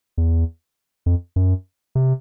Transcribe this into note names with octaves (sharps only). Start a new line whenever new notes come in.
E2
F2
F#2
C3